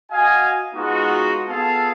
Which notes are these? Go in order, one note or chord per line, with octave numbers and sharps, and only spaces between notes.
F#4 D#5 F5 G#5
G#3 B3 D#4 F4 F#4
B3 F4 G#4 A4 F5 A5